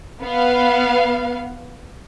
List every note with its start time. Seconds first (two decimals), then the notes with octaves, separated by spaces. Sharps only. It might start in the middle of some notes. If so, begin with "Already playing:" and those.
0.22 B3 F5